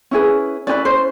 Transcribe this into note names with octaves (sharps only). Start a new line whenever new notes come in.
C#4 E4 G#4 B4
C#4 E4 G#4 B4 D5
C5